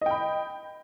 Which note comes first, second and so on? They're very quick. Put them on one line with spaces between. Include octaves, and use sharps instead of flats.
D#5 G5 B5